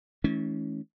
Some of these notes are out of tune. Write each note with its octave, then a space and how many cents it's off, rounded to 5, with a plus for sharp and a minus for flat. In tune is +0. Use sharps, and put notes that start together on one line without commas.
E3 -40 A3 -40 C#4 +0